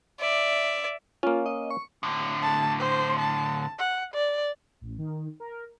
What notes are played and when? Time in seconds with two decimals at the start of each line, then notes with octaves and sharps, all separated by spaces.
0.20 D5 E5
1.23 A#3 C#4 F4
1.46 D#5
1.71 C#6
2.03 A2 D3
2.42 A5
2.79 C5
3.20 A5
3.79 F#5
4.14 D5
4.81 A1
4.98 D#3
5.40 A#4